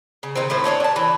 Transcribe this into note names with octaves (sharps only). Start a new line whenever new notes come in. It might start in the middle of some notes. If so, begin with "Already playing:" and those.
C#3
D#3 E3 C4
A2 D#3 A3 C4
C#4 D4 C5 C#5
D4 A5
E3